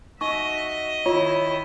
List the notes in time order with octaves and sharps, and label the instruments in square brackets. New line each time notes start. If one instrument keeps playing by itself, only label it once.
[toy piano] D#4 C#6 [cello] F#4 E5 [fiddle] D#5
[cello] D#3 E4 [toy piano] F4 [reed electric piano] C#5